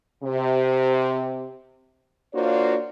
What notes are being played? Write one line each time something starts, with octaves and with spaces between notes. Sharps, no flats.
C3
A#3 D4 F4 F#4 C5 C#5